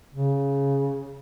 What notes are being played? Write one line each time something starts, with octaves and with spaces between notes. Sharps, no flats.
C#3